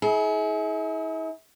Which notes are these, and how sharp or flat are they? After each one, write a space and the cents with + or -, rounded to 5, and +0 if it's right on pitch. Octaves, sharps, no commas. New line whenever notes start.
E4 -40 G#4 +30